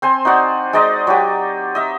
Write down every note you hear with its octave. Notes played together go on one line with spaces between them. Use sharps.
C4 C5 G#5
D#4 F#4 D5 F#5
G#3 D#4 D5 D#5
F#3 G4
D#5 E5